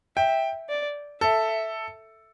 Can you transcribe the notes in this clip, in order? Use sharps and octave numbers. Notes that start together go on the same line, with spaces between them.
E5 G5
D5
A4 E5